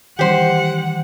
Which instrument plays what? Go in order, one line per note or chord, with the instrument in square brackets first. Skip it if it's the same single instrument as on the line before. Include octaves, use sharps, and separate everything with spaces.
[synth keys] D#3 E3 G3 [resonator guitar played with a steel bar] G4 C5 [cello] F#5